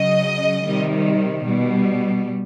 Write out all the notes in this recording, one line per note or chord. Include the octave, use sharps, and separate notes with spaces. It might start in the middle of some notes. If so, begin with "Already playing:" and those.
Already playing: C#3 F#3 D#5
C3 D#3 G3
B2 G3